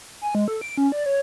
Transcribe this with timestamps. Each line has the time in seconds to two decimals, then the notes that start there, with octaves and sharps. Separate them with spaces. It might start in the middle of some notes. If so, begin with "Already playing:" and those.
0.22 G#5
0.35 G#3
0.48 A4
0.61 D7
0.78 C#4
0.92 D5
1.06 C#5